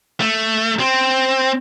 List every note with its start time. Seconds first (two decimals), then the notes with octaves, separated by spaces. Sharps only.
0.20 A3
0.80 C4